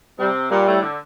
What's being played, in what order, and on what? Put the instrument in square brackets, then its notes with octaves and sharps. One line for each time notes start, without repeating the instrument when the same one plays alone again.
[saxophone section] C3 C4 [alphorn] G3
[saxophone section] A#2 A#3 [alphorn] G3
[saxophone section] A2 A3
D3